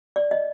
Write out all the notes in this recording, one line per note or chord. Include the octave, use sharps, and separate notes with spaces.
D5
D#5